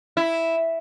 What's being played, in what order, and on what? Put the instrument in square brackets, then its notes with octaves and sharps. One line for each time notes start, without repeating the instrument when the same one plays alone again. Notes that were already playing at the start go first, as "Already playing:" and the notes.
[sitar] E4